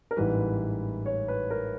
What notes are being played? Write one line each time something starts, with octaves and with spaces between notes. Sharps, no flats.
A#4
A1 G#2 E3 G3 B4
C#5
B4
A#4